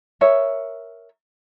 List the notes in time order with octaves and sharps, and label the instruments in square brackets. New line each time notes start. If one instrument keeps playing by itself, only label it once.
[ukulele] A#4 C#5 E5